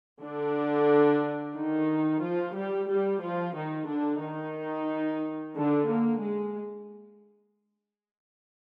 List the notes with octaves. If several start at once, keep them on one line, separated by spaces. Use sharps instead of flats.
D3 D4
D#3 D#4
F3 F4
G3 G4
G3 G4
F3 F4
D#3 D#4
D3 D4
D#3 D#4
D3 D4
A#3
G#3